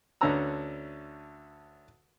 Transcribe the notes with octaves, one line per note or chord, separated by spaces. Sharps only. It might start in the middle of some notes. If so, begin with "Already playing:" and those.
D2 D3 C#4 B4 A#5 E6